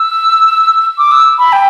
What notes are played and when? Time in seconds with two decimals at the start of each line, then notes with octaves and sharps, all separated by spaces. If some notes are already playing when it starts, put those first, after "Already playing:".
Already playing: E6
0.98 D6
1.12 E6
1.38 B5
1.53 G5